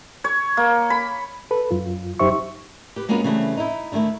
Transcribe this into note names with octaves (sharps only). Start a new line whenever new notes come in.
C#5
A#3
B5
A4 B4
F#2 F4
F#2 D#4 G4 C5 E5 C#6
G4 B4
G#3 A#3 B3 C#4 F4 F#4
C#3 E3 G3 A3 C4
D#4 E4
D3 D#3 G3 A3 E4